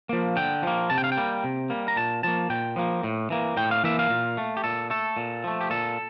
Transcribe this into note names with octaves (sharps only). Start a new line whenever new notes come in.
F3 A#3
D3 G5
F3 A#3
C3 A5
G5
F5
G5
G3 A#3
C3
G3 A#3
A#5
A#2 A5
F3 A#3 A5
A#2 G5
F3 A#3
A2
E3 A#3
A2 G5
F5
E3 A#3 E5
F5
A#2
A3
G4
A#2 A4
A3 A4
A#2
F3 A3
G4
A#2 A4